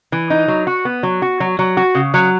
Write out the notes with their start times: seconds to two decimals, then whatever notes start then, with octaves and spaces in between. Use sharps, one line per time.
0.12 E3
0.30 D#4
0.48 F#3
0.67 F#4
0.85 B3
1.03 F#3
1.22 F#4
1.40 F#3
1.59 F#3
1.77 F#4
1.95 C#3
2.14 F#3